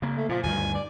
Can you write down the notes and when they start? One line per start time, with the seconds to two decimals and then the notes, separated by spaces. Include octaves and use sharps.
0.02 C#3 A#3
0.17 A3
0.29 A#2 F3
0.43 D2 G2 D#3 G#5
0.74 D5